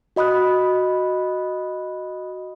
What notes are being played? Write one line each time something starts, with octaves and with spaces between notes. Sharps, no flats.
F#4 D#5 B5 D#6 F#6